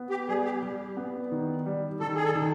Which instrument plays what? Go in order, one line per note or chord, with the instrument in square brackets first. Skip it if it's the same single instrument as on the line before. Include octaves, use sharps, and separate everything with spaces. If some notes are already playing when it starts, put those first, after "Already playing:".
Already playing: [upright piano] B3
[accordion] G4
[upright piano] G3 [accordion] G#4
[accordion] G4
[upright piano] G3
B3
D#3
G3
[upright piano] D#3 [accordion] A4
[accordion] G#4
A4
[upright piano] D#3